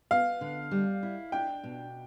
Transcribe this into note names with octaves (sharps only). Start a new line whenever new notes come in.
B3 F5
D3
G3
E4
D4 G5
B2